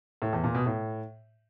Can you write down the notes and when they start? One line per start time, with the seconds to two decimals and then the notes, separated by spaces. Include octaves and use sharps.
0.22 A2
0.33 E2
0.44 A#2
0.55 B2
0.66 A2